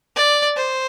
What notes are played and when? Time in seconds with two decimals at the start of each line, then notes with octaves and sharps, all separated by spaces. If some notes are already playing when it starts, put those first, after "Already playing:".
0.16 D5
0.57 C5